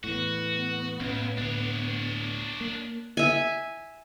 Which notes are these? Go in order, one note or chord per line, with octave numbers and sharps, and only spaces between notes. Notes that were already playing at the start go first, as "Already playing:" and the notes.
E2 A2 B3 F#4
C#2 A2 C#4
D2 A2 D4 C#5
A#3
E5 G#5